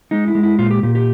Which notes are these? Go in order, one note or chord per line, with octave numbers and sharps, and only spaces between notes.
G#3 D#4
E4
G#3
E4
A#2 F4
G4
A#2 G4
G4